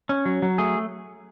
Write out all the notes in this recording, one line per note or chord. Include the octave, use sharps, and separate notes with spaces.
C#4
F#3
F#3
A3 G#4